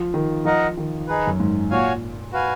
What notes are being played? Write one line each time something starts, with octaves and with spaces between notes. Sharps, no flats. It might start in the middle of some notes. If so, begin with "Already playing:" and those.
Already playing: F3
D#3
F3 D#4 A#4 D#5 F#5
D#3
D#4 G#4 B4
F#2
G#2
A#2 F#4 C#5 F5 G#5
F#4 B4 F5 G#5